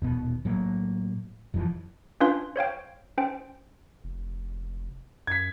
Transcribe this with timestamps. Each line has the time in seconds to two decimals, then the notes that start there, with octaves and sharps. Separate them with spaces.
0.02 D#1 B2 B3
0.45 A2 F#3 A#3
1.54 E1 F2 E3 F3
2.21 C#4 D4 F4 B4 F5 C6
2.56 C5 C#5 F5 G5
3.18 C#4 C5 G5
4.04 F1
5.27 F#2 G#6 B6